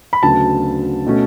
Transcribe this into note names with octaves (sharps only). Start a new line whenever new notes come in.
B5
D2 C#3 F#3 B3 A5
B2 A3 C#4